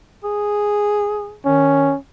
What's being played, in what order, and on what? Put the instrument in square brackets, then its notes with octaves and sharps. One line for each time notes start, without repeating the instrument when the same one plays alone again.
[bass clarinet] G#4
[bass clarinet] D#3 [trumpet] C#4